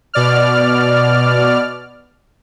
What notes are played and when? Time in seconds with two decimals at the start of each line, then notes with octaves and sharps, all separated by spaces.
0.14 B2 D5 F6